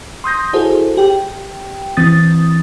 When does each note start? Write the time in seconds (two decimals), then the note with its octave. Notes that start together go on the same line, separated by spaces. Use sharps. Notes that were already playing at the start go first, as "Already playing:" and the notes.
0.24 C6 D#6 G6 A#6
0.53 E4 F#4 G#4 A4 C5
0.97 G4 G5
1.97 E3 C4 D#6 A6